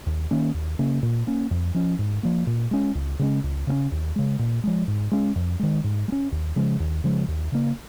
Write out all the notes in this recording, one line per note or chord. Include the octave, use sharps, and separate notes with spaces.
D#2
D#3 A#3 C#4
D#2
C#3 A#3 C#4
A#2
A#3 C#4
F2
F3 C#4
G#2
F3 A#3
A#2
G#3 C#4
C#2
C#3 G#3 C#4
C#2
C#3 A#3 C#4
D#2
C#3 G#3
A#2
F3 G#3
G#2
G#3 C#4
F2
D#3 G#3
G#2
G#3
C#4
D#2
C#3 F3 G#3
D#2
C#3 F3 G#3
D#2
C#3 A#3